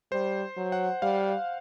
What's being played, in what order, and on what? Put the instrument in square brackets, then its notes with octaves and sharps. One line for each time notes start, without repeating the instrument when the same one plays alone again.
[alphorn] G3 [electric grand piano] C5
[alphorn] F#3
[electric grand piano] F#5
[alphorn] G3 [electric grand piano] F5